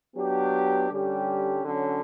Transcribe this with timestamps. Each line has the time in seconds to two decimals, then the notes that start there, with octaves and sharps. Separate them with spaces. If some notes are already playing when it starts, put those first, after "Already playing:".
0.15 F#3 B3 D4 G4
0.89 D3 G3 C#4 G4
1.63 D3 F#3 C#4